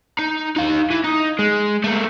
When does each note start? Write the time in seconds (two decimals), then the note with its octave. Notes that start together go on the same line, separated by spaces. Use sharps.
0.19 D#4
0.57 D#4 F5
0.90 E3
1.04 D#4
1.39 G#3
1.84 A3 A#3